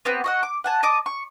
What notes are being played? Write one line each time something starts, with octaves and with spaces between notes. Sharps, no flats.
B3 C4 G4
F#4 D#5 F#5
D6
F#5 G#5 A5
D#5 A5 D6 D#6
C#6